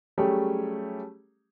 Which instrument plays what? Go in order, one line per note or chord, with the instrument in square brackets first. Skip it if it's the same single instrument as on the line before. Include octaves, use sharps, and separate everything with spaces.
[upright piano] F#3 G3 A3 C#4 G4 G#4